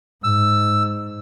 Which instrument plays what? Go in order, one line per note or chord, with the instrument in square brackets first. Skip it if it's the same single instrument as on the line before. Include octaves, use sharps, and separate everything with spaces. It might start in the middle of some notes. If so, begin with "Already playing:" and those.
[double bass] G#2 [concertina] E6